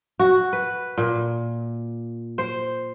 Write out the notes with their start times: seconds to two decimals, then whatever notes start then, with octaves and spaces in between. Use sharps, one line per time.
0.20 F#4
0.53 B4
0.98 A#2
2.38 C5